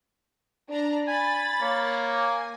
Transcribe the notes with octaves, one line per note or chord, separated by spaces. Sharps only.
D4 A#5
G#5 B5 A6
A#3 C#5
G#5